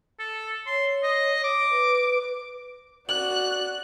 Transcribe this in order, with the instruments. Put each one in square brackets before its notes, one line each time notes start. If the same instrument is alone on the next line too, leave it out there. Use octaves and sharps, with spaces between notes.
[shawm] A4
[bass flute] C#5 [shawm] C6
[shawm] D#5
D6
[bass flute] B4
[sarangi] F#4 [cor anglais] D5 [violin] F#6 [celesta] F#7